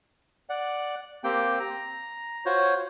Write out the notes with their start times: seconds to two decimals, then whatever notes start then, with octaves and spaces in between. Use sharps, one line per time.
0.50 D5 F#5
1.24 A#3 C4 G4 G5
1.60 A#5
2.46 F4 F#4 C5 C#5